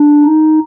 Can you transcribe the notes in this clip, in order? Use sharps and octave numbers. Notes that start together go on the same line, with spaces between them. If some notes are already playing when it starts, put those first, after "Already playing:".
Already playing: D4
D#4